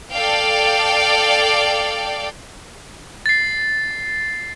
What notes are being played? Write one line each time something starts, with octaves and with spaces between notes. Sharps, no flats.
A4 D5 F5 G5
A6 C7